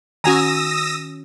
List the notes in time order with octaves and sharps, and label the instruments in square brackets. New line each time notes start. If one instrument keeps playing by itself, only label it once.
[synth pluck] D#3 C#4 [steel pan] F#4 G#5 A#5 [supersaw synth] D#6 E6 A#6